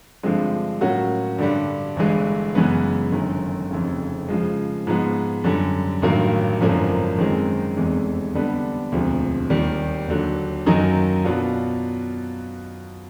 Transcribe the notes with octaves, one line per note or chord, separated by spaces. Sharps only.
G2 D3 F3 G#3 C4
A2 F#3 A#3 C#4 F#4
G2 D3 G3
G1 G2 E3 G#3
F#2 C#3 E3 G#3 B3
G1 F#2 D#3
F1 F2 C#3
C#3 F3 G#3
G#2 F3 G#3 B3
F#2 D3 G3
A1 G2 D#3 F#3 A#3
G#1 F#2 D3 F3 A#3
F#2 D#3 G#3 C4
F1 E2 C3 E3 G#3
D3 G3 B3 D4
E1 D2 C3 F3
D#2 D#3 G3
D#2 D3 F#3
F#2 D#3 F#3 A#3 D#4
B2 F#3 B3 D4 F4